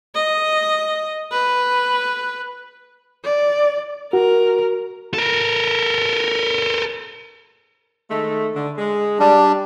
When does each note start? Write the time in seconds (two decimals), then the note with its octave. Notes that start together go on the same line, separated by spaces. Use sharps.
0.15 D#5
1.32 B4
3.24 D5
4.13 F#4 A#4
5.14 A4 A#4
8.10 D#3 G#3 A3
8.55 D3
8.78 G#3
9.19 G3 D4